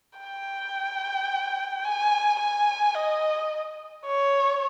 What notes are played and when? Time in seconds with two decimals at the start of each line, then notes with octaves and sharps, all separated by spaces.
0.19 G5
1.85 G#5
2.40 G#5
2.95 D#5
4.06 C#5